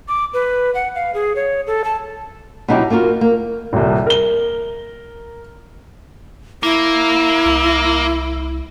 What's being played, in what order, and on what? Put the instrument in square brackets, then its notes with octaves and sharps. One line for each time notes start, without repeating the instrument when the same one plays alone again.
[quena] D6
B4
F#5
F5
G#4
C#5
A4
A5
[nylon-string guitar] B2 F#3 D#4 E4 F#4 G4
A#3 F4 F#4 A#4
A#3
[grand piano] D#1 C2
A#4 G7
[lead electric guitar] A#3 [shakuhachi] E4
[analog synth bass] C2